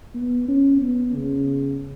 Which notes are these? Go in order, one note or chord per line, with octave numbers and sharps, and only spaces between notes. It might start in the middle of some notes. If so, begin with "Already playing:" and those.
B3
C#4
B3
C#3